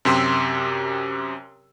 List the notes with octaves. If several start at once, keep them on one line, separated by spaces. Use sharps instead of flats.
F#2 C3 G4 C6 E6